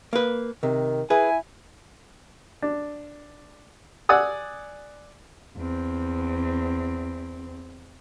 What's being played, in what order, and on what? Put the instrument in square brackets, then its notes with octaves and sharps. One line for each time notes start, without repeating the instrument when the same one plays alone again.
[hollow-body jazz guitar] A#3 B4
[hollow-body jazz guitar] C3 [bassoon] D#3
[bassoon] E4 [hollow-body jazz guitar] G#4 B4 [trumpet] G#5
[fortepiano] D4
D5 F#5 G#5 D#6 E6
[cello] E2 C4